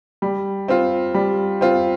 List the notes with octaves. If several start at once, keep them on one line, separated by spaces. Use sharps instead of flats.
G3
C4 F4
G3
C4 F4